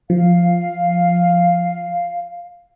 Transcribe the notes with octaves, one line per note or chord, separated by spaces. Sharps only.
F3 F5